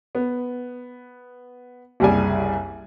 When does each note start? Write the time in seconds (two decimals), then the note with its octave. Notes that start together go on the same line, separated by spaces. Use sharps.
0.15 B3
2.00 F#1 C2 G3 G#4 D5 G#5